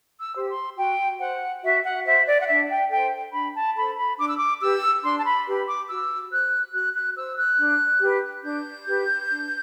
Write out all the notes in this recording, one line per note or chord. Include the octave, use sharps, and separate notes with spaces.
E6
G4 C5
C6
F#4 G5
C5 F#5
F#4 E5
F#5
C5 E5
D5
F#5
D4 E5
G5
A4 C5 G5
D4 B5
A5
A4 C5 B5
B5
D4 D6
E6
D6
G4 B4 E6
D4 C6
A5
B5
G4 B4
D6
F#4 E6
C5 F#6
F#4 F#6
F#6
C5 E6
F#6
D4
G4 B4
D4 G6
G4 B4
D4